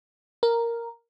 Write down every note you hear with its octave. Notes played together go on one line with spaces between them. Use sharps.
A#4